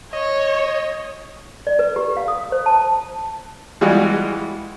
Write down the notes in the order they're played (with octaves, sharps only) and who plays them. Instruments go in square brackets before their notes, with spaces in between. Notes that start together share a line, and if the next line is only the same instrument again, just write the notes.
[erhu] C#5 [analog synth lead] D#5
[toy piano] D5
B4
G4
F5
D#6
C5
A5
[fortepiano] E3 G3 G#3 F4 F#4